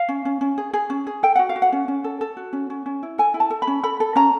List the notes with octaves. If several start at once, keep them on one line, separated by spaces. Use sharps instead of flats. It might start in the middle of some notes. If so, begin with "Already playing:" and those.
Already playing: F5
C#4
C#4
C#4
G#4
G#4
C#4
G#4
A4 G5
F#4 F#5
F5
F#4
F#5
C#4
C#4
A4
A4
F#4
C#4
C#4
C#4
E4
A4 G#5
E4
A5
A4
B5
C#4
A4 B5
A4
C#4 A#5